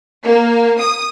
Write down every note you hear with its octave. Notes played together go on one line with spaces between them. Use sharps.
A#3
D#6